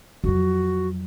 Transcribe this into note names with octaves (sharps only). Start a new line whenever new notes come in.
F2 F#3 F#4